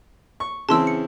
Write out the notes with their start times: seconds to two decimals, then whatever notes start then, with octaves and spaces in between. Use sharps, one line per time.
0.40 C#6
0.69 C#3 E3 C4 A5 C6 E6
0.87 C#7